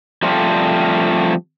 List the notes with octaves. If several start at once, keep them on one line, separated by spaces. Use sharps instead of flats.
F3 G3 A3 C4 D4 F4